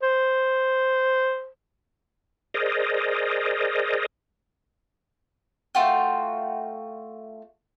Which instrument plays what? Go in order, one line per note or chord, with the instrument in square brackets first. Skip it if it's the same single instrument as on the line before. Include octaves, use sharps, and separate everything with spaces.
[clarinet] C5
[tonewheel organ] G#4 A#4 C5 D5 D#5
[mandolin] A3 F4 F#4 G5